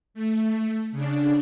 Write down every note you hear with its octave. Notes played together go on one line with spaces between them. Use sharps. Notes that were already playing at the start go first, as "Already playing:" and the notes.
A3
C#3 D4